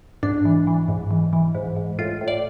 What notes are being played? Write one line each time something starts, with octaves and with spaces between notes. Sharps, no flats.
G#2 D4
E3
E3
G#2
E3
E3
G#2
G#2
A2 F4
A2
D5